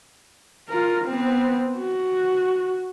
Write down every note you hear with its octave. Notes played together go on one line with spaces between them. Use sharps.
F4 A#4
B3 C4
F#4